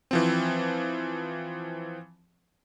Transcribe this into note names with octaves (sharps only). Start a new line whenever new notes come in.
E3 F3 C4